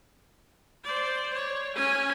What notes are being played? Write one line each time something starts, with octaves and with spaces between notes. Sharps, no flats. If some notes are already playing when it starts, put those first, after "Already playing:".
C5 D5
C#5
C#4 G#5